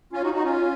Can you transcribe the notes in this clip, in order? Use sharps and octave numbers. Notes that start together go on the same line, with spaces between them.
C#4 F4
D#4 F#4
D#4 F#4
C#4 F4